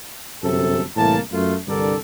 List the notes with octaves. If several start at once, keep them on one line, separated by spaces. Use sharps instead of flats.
G1 F#2 C3 A4
C2 A2 E3 A#3 A5
F#2 A3 F4
C2 G2 D3 A4 A#4 D5